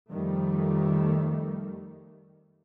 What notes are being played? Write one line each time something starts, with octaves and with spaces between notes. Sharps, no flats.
F2 D#3 G3 A3